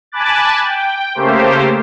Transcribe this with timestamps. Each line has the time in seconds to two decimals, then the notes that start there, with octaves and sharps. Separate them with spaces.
0.12 G#5 A5 B5 D6 F#6 A6
0.63 G5
1.15 C#3 A3 A#3 G4 C5